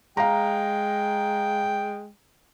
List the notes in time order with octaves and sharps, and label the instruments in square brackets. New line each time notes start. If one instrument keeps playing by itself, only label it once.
[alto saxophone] G#3 [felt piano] F5 A#5 [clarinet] G5